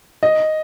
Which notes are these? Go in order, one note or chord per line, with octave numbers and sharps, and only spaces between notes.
D#5